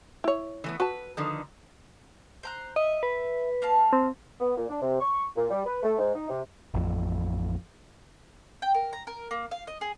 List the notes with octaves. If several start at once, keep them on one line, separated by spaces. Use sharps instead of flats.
E4 C#5
E3 A3 B3
F#4 B4 A5
D3 D#3 F3
C5 A#5 F#6
D#5 E5
B4
A#3 F5 A5
C4
B3
A#2
D4
C3
C#6
A#2
G3
B4
A3
G#2
D#4
C3
A1 F2
G5
A#4
A#5
A#4
A#3
F5
D#5
G#4